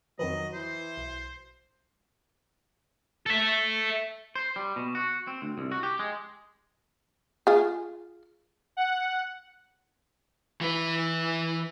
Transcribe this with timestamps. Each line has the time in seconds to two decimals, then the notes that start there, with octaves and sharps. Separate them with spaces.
0.19 F2 D#3 F3 F#3 B4 D#5
0.54 E3 C5
0.97 B1
3.26 A4 E5
4.36 C5
4.56 G3
4.76 B2
4.95 F#4
5.27 C4
5.42 D2
5.58 C2
5.72 F#4
5.83 G4
5.99 G#3
7.47 F4 G#4
8.77 F#5
10.61 E3 B4